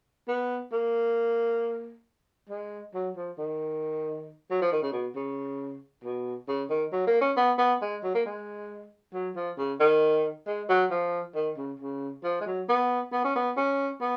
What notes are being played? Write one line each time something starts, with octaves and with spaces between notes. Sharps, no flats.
B3
A#3
G#3
F#3
F3
D#3
F#3
F3
D#3
C#3
B2
C#3
B2
C#3
D#3
F#3
A#3
C#4
B3
B3
G#3
F#3
A#3
G#3
F#3
F3
C#3
D#3
G#3
F#3
F3
D#3
C#3
C#3
F3
G#3
F#3
B3
B3
C#4
B3
C#4
B3